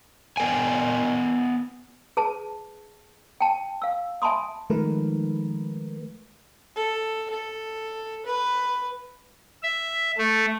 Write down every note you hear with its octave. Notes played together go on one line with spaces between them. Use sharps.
B3 A#4 G5 G#5
G#4 B4 A5
G5 A5
F5 E6
E5 G#5 A5 B5 C6 D#6
D#3 F3 G#3 A3 A#4 B4
A4
A4
B4
E5
A3